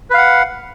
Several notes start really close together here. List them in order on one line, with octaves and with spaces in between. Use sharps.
B4 F5 F#5